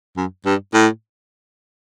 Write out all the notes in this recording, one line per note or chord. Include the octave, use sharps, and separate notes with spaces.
F#2
G2
A2